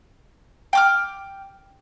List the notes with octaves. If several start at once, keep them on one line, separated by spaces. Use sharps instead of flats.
G5 D6 F6